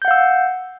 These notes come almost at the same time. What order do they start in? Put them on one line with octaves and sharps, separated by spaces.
G6 F#5 F5 E6